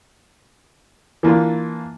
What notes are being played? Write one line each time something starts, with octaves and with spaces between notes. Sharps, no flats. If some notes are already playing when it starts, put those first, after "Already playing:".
E3 A#3 D4 F4